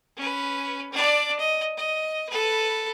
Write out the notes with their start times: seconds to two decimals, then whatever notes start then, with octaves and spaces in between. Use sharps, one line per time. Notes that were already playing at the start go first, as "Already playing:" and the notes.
0.17 C#4 B4
0.92 D4 D5
1.39 D#5
1.77 D#5
2.29 A4 B4